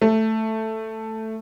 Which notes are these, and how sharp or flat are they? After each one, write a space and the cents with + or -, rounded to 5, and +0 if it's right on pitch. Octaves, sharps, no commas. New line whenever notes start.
A3 +5